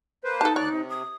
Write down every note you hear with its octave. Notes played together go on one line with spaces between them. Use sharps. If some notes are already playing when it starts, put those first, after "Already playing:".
A#3 B4 C5
D#4 A4 A5
D2 C#5 D5 F#6
C3
D#6